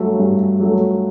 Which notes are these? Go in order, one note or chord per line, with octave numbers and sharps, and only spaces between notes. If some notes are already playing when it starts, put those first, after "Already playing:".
Already playing: G2 F#3 A3
G2
F#3 A3